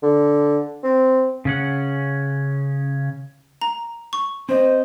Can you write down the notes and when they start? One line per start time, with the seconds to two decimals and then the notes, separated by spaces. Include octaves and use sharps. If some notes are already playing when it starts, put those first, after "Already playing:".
0.03 D3
0.83 C4
1.45 C#3 C#4 F#5
3.62 A#5
4.13 C#6
4.49 C4 C5 D#5